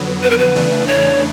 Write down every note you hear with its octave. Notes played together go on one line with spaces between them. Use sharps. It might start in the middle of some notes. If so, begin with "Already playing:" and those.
Already playing: F2 D3 F#3 B3
B4
A#4
B4
E2 C#3 E3 A3 D4
C#5